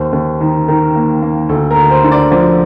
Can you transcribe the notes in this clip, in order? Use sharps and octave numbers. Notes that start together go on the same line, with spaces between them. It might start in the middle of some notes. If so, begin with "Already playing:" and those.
Already playing: D#2 C5
D#2
D#3
D#3 A#4
A#3
A#3
D2 A4
A#4
D2
C5
D3
D5
F3 D5